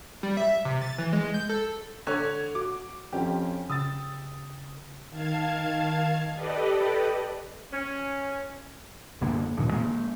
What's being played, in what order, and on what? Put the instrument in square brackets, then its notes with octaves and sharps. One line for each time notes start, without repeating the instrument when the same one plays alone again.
[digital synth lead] G3
E5
C3
A6
E3
G#3
G6
A4
[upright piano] D3 C#5 [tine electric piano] G#6
[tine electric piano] F#4 [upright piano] D6
[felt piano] F2 C#4 F4 [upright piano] G4
[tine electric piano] C#3 [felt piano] D#6 E6 A6
[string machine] D#3 F5 A5 G#6
G4 A4 B4 D5 D#5
[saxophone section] C#4
[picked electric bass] G1 F#2 D3 A#3
D2 G2 A#2 D#3
G#3 A#3